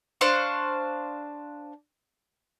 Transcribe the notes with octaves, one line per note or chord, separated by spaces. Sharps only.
D4 C5 F5 C#6